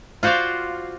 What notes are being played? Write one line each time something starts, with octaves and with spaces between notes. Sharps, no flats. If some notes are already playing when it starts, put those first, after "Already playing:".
F4 F#4 C5 D5 F5